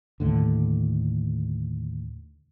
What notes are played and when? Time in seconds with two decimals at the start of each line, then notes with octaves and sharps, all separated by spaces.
0.20 D#2 A2 D3